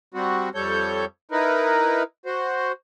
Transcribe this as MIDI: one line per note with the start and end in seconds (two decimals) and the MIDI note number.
0.14 0.49 55
0.14 0.49 60
0.14 0.49 66
0.55 1.05 41
0.55 1.05 55
0.55 1.05 69
0.55 1.05 73
0.55 1.05 91
1.31 2.03 63
1.31 2.03 64
1.31 2.03 70
1.31 2.03 71
2.26 2.72 66
2.26 2.72 72